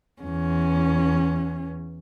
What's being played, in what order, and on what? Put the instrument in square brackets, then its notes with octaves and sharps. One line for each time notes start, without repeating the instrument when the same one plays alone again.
[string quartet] E2 C#4